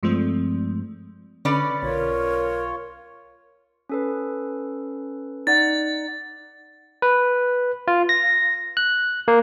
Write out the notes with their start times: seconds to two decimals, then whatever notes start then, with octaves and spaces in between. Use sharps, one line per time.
0.03 G2 F3 G#3 A3 C4
1.45 D3 C#4 B4 D5
1.83 B1 F4 A#4 C#5
3.89 C#4 A4 B4
5.47 D#4 D5 F#5 A6
7.02 B4
7.88 F4
8.09 A#6
8.77 F#6
9.28 A#3